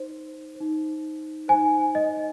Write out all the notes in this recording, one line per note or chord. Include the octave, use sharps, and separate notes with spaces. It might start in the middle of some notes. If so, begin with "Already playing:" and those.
Already playing: D#4 C5
D#4 C5
D#4 C5 G#5
D#5